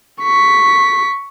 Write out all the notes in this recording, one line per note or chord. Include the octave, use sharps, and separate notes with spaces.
C#6 B6